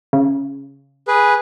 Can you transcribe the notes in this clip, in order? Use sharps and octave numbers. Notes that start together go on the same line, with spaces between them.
C#3
G#4 B4